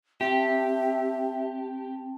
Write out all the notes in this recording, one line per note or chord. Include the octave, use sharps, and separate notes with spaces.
C4 G4 E5 G5 A5